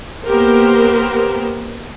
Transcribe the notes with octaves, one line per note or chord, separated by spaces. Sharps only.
A#3 B3 G4 A#4 C5